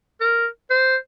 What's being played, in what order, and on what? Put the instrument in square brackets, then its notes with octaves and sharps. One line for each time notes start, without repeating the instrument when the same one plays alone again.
[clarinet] A#4
C5